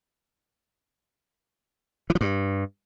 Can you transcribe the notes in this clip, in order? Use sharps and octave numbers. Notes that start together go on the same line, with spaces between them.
E3
F3
G2